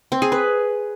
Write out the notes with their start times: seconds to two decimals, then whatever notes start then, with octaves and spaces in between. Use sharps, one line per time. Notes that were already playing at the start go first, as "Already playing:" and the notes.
0.12 C4
0.22 G#4
0.32 B4